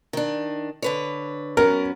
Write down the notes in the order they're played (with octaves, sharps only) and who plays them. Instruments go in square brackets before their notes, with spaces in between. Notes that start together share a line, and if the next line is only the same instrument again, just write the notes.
[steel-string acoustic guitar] D#3 D4
D3 B4 C#5
[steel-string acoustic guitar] F#3 B3 C#4 [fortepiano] A#4